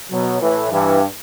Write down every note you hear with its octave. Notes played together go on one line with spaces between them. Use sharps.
B2 F#3
A2 E3
G2 E3